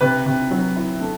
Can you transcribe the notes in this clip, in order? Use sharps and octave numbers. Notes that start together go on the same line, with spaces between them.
C3 B4
C3
F#3
E4
A3